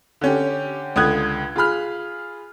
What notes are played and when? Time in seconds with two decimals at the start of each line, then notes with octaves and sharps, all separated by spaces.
0.21 D3 C#4 G4
0.96 C#2 D3 D#6 F#6 G#6
1.56 F4 G#4 B5 F6